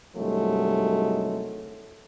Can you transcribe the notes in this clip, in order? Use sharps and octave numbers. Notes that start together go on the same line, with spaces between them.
C2 G2 D#3 F#3 G#3 A3